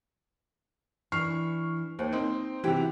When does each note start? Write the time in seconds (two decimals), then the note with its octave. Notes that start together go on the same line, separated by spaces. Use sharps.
1.12 E3 D4 C#6 F6 C7
1.99 D#2 C5
2.12 C4 D#4
2.64 C3 E3 F#4 G4